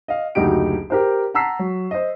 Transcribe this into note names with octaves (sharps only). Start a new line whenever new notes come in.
D#5 F5
F#1 D2 D#4 F#4 G4 D7
G4 A#4 C5
F#5 A5 A#5 E6 B6 C7
F#3
C5 D#5